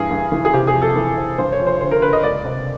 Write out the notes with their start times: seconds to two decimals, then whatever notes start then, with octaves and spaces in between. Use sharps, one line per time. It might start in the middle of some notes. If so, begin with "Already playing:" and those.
Already playing: G2 E3 G#4
0.11 G2
0.32 E3
0.45 G#4
0.53 C3 G4
0.67 G#4
0.74 F2
0.82 A4
0.96 E3
1.17 C3
1.38 G2 C5
1.52 C#5
1.60 F3
1.67 C5
1.80 D3 C5
1.91 A#4
2.02 D3 B4
2.13 D#5
2.23 C#2 D5
2.45 C3